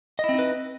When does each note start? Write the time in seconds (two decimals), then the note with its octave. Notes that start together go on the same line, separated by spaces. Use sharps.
0.19 D#5
0.24 E4
0.29 C4
0.34 D#4
0.39 B4